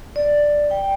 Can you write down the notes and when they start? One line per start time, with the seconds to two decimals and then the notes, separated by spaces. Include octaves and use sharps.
0.16 D5
0.71 G5